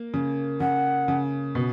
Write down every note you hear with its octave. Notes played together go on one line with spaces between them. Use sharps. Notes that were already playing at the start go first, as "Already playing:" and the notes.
Already playing: A#3
C#3
C#3 F#5
C#3
B2